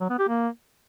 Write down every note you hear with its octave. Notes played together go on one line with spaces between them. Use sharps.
F#3
B3
G4
A#3